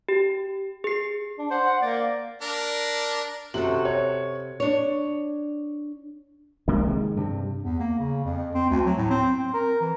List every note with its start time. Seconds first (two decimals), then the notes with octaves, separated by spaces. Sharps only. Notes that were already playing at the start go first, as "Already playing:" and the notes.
0.09 G4
0.84 G#4 C7
1.38 D4
1.51 C5 F#5
1.65 F#5
1.82 A#3 D5
2.42 D4 A#4
3.54 F#2 C3 F#4 A4 F#7
3.85 C#5
4.60 D4 C#5
6.68 C2 C3 G#3 A#3
6.87 D#3 G#3
7.16 G2 C3
7.63 E2
7.80 A#3
7.99 C#3
8.24 F2
8.54 C4
8.70 D2
8.85 F#3
8.97 A2
9.10 C4
9.38 C4
9.54 A#4
9.81 E3